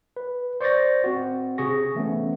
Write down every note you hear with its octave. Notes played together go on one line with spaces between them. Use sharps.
B4
C5 D5 C#6 G6 A6 A#6
C4 F#4
C3 G#4 C#6 A#6
E3 A3 B3 C#4